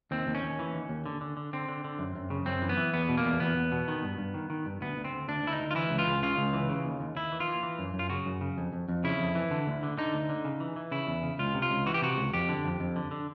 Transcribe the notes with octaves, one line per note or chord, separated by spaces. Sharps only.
D#2 C4
D#2
C#4
D#2
E3
D#2
D#2
D3
D3
D3
D3 C4
D3
D3
F#2
F#2
C#3
F#2 C4
E3
B3
E3
E2 B3
B2
A#3
E2
E2 B3
E2
B2
D#3
G2
G2
D#3
D#3
G2
D2 B3
D2
C4
D2
D2 D4
D2 E4
D#4
D2
F4
E3 E4
C#2
F4
C#2
C#3 F4
C#2
E3
C#3
D#2
D#2
D#2 E4
E3
F4
E3
E3
F#2
F#2
F4
C#3 F#4
F#2
C#3
F2
F2
F2
C#3 E4
F2
E3
D3
D2
D3
D3 D#4
D2
D3
C#3
E3
E3
C#3 E4
E2
C#3
C#2 F4
C3
F4
C#2
E3 F#4
G4
C3 F#4
C#2
F2 G4
D3
F2
F2
D3
D3